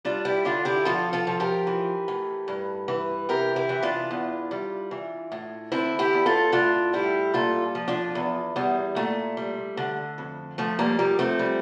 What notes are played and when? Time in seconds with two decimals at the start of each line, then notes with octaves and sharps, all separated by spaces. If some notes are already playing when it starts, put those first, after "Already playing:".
0.05 G3 D4 F4
0.25 E4 G4
0.45 D3 D4 F4
0.65 E4 G4
0.85 F3 F4 A4
1.13 F4 A4
1.27 F3
1.40 G4 A#4
1.67 E3
2.08 A2
2.48 G2
2.88 E3
3.29 C3 G4 A#4
3.56 E4 G4
3.69 E3
3.83 D4 F4
4.11 E2
4.51 G3
4.91 E3
5.32 A2
5.72 D3 C4 E4
5.99 E4 G4
6.13 E2
6.26 F4 A4
6.52 A2 D4 F4
6.93 G3 E4 G4
7.34 A#2 F4 A4
7.75 F3
7.88 D4 F4
8.15 E2
8.56 E2 G3
8.96 A#2 A3
9.37 G3
9.77 D3
10.18 F2
10.58 F3 A3
10.79 G3 A#3
10.99 F3 G3 A#3
11.19 A3 C4
11.39 G3